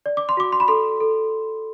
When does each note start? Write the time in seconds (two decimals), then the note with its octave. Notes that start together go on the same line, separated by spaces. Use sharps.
0.06 D5
0.17 D6
0.29 C6
0.37 F#4 D6
0.52 C6
0.60 B5
0.68 A4 C6
1.00 A4